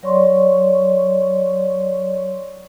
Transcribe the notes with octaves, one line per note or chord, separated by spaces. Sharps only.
F#3 C#5 D5 C6 C#6